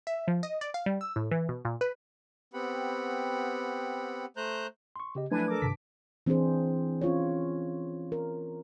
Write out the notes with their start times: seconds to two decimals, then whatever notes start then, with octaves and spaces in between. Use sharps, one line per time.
0.07 E5
0.28 F3
0.43 D#5
0.61 D5
0.74 F5
0.86 G3
1.01 E6
1.16 A2
1.31 E3
1.49 B2
1.65 A#2
1.81 B4
2.54 B3 C4 G4 F#5 B5
4.37 A3 C5 A#5 F#6 G6
4.96 C6 C#6
5.15 C#3 G4 D#5
5.31 F3 F#3 A3 D4 E4 B4 G#5 G#6
5.48 A4 A#4 D6
5.62 G2 C3 D#3 A5 B6
6.26 E3 C4 D4 E4 G#4 C5
7.01 C#4 F4 C#5
8.12 A#4